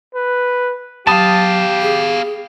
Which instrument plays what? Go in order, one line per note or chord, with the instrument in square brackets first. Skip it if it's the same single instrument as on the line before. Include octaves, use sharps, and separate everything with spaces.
[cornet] B4
[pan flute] F#3 [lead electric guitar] B3 F5 [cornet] G4 [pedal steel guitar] A5 D#6
[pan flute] G#4